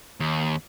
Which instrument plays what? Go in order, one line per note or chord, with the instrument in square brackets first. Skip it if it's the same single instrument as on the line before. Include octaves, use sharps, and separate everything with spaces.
[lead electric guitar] D#2